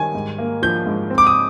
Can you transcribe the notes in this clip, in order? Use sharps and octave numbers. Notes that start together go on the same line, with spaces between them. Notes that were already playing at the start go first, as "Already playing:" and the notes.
Already playing: D#3 G3 G#5
G#2
A#3
F3 G6
G#2
C4
D6
D#6